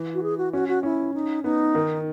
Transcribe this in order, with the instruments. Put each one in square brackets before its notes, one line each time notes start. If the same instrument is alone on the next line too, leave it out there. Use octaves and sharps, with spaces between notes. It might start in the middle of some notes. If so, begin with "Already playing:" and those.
Already playing: [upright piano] E3
[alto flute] F#4
G#4
F#4
[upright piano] C#4 [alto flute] F#4
[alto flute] F#4
[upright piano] C#4 [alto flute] E4
[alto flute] D#4
[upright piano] B3 [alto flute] D#4
[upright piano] D#3